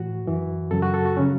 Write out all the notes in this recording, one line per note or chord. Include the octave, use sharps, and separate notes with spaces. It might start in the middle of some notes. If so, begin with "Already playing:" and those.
Already playing: A2 E3 F#4
F#2 E3
F#2 C#3 F#3 A4
F#4
A4
F#4
C#3 F#3 C#4